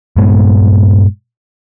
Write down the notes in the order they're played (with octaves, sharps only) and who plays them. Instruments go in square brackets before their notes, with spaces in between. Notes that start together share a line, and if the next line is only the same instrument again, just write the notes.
[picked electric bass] G2 A#2 G#3 B3